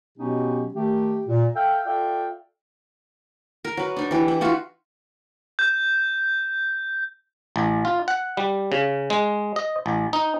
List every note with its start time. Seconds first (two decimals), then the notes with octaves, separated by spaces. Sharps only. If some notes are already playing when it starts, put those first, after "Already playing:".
0.18 B2 F#3 B3 C#4 D#4 G4
0.75 D#3 A3 G4
1.28 A#2
1.55 A4 E5 F5 G5
1.86 F4 A4 D5 E5 F5 G5
3.65 A#4
3.77 F#3 B4
3.96 D4 D#4
4.11 E3 G4
4.28 E4
4.41 D#4 F4 F#4 E5
5.59 G6
7.56 A1
7.85 F4
8.08 F#5
8.37 G3
8.72 C#3
9.10 G#3
9.56 D#5
9.86 A1
10.13 D#4